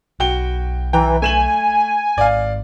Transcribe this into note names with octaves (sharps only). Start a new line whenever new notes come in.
B1 F#4 G5 G7
E3 G5 A#5
A3 G#5 E7 F#7
G#1 D5 F5